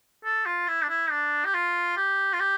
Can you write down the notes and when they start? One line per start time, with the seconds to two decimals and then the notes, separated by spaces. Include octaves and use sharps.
0.25 A4
0.46 F4
0.68 E4
0.83 D4
0.89 E4
1.11 D4
1.45 G4
1.54 F4
1.97 G4
2.33 F4
2.40 G4